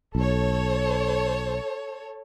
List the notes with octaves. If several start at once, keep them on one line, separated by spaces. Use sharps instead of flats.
B1 A4 C#5